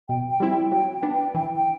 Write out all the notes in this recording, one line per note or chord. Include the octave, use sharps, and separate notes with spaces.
B2 G5
G5
G3 C4 E4
G5
F#3 G5
G5
B3 D4
G5
E3 G5
G5